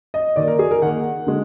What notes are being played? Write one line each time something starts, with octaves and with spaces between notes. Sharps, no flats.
D#5
D#3 A#3 D5
A#4
G#4
A#4
D#3 A#3 F#5
D3 G#3